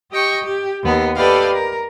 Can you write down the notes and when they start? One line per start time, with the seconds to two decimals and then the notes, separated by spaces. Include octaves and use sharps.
0.11 G4 D#5 G5 C#6
0.44 G4
0.83 D#2 B3 D#5
1.16 G4 A4 B4 D5 D#5 F5
1.53 A#4